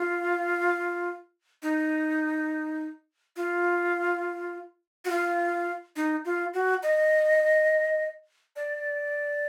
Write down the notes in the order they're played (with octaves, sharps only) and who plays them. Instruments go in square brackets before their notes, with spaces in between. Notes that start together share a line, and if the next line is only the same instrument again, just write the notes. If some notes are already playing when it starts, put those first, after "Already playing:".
Already playing: [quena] F4
D#4
F4
F#4
F4
D#4
F4
F#4
D#5
D5